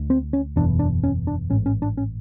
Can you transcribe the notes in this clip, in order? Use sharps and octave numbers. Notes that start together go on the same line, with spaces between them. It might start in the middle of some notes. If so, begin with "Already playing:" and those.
Already playing: D2 D3
C4
C#4
F#1 E2 B2 D4
D4
C#4
D4
A1 G#2 C#4
C#4
D4
C#4